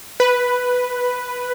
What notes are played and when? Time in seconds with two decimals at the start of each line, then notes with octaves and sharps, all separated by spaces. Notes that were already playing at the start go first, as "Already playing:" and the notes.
0.20 B4